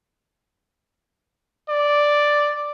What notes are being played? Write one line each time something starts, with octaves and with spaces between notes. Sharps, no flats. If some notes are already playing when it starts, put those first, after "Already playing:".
D5